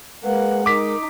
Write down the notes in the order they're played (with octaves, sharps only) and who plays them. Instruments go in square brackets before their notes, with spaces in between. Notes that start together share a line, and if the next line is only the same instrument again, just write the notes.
[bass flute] G#3 [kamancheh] A#3 F#5 [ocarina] B4
[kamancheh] D#4 [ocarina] A#4 [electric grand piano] D6 B6